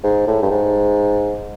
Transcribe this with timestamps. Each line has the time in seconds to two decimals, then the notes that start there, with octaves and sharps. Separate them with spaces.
0.04 G#2
0.27 A2
0.42 G2
0.51 G#2